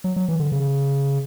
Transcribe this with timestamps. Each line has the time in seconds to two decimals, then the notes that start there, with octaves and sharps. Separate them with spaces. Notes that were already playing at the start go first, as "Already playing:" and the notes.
0.04 F#3
0.16 F#3
0.28 E3
0.39 D3
0.52 C#3